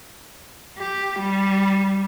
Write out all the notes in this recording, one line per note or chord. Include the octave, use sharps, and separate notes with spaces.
G4
G3